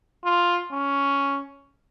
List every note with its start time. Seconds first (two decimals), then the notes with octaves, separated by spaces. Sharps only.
0.25 F4
0.73 C#4